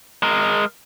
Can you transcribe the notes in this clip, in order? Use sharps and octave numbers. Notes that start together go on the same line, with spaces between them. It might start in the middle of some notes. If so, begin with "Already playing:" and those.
G#3 A#4